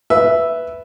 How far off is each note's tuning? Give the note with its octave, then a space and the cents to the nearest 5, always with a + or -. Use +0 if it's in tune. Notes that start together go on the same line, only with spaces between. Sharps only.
B4 +0 E5 +0